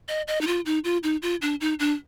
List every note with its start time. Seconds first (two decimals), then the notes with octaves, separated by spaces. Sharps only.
0.08 D#5
0.28 D#5
0.41 D#4
0.47 F4
0.66 D#4
0.84 F4
1.03 D#4
1.22 F4
1.42 D4
1.61 D#4
1.79 D4